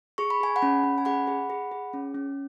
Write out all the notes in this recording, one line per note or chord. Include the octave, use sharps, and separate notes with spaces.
G#4 C#6
B5
G#4 G#5
F#5 B5
C#4
C#4
G#5
G#4 F#5 B5
G#4
G#4
G#4
C#4
C#4